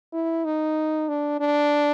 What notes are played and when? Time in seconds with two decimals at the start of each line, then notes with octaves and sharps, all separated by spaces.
0.13 E4
0.45 D#4
1.09 D4
1.41 D4